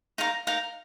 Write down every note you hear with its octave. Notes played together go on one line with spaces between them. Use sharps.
D#4 A#4 F5 A#5
D#4 A#4 F5 A#5